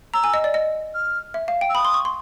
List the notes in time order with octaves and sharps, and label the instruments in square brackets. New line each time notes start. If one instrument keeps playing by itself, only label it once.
[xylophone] A#5 [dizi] E6
[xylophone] G#5
D#5
D5
D#5
[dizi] F6
[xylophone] E5
F5
G5
[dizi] E6
[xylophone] B5 [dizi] D#6
[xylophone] C6
C#6
C6